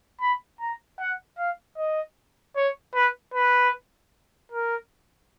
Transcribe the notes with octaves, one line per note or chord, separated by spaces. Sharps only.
B5
A#5
F#5
F5
D#5
C#5
B4
B4
A#4